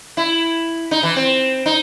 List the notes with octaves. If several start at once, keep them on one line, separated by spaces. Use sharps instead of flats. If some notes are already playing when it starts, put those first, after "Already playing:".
E4
D#4
E3
C4
D#4